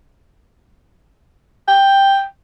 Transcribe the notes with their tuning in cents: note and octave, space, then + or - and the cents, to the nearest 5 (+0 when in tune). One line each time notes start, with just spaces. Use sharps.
G5 +5